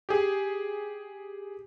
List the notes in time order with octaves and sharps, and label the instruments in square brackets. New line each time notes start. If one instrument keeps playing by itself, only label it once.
[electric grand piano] G4 G#4